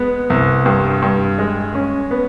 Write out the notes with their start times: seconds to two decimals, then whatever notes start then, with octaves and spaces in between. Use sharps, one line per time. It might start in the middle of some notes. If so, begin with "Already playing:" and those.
Already playing: G#3 B3
0.30 C2
0.66 G2
1.02 G2
1.39 G#3
1.75 C#4
2.11 B3